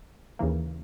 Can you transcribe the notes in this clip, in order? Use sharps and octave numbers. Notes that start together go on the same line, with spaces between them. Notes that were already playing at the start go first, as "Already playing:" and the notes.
D#2 C#3 E3 A#3